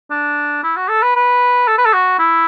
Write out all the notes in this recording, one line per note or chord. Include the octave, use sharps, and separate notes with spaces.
D4
E4
F#4
A4
B4
B4
A4
B4
A4
F#4
E4